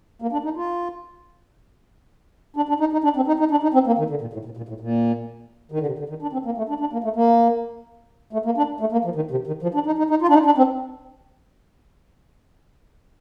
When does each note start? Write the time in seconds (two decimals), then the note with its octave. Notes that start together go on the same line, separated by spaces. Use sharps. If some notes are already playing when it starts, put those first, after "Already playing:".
0.22 A#3
0.32 D4
0.44 D#4
0.56 F4
2.56 D4
2.69 D4
2.80 D#4
2.92 D#4
3.04 D4
3.16 C4
3.27 D#4
3.39 D#4
3.51 D4
3.63 D#4
3.74 C4
3.87 A#3
3.98 D#3
4.10 D3
4.21 A#2
4.33 A2
4.45 A#2
4.57 A#2
4.69 A2
4.80 A#2
5.72 D#3
5.79 D3
5.86 C3
5.99 D3
6.09 D#3
6.22 D4
6.33 C4
6.45 A#3
6.58 A3
6.69 D4
6.80 D4
6.93 A#3
7.04 A3
7.16 A#3
8.33 A3
8.45 A#3
8.57 D4
8.80 A3
8.92 A#3
9.05 F3
9.16 D#3
9.31 C3
9.47 D#3
9.63 F3
9.74 D4
9.86 D#4
9.98 D#4
10.10 D#4
10.22 F4
10.29 D4
10.33 D#4
10.45 D4
10.58 C4